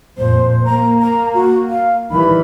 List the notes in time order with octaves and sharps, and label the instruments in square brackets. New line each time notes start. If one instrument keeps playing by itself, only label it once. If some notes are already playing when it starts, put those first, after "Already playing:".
[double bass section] F2 A#2 [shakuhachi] C5
[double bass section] A#3 [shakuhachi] A#5
[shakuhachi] A#5
F#4
F5
[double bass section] D#3 E3 G3 [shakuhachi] B5